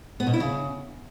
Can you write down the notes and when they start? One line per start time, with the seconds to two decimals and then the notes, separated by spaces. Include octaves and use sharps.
0.20 B3
0.27 B2
0.33 E4
0.40 C#3